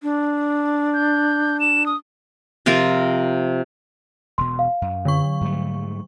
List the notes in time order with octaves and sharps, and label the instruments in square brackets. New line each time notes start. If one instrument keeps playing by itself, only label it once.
[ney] D4
[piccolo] G6
E7
D#6
[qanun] C3 F3 F4 A#4
[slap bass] E1 B2 [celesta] C6
[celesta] F5
[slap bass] F#2
[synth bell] D3 F#3 C#6
[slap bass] G#2 G3 A3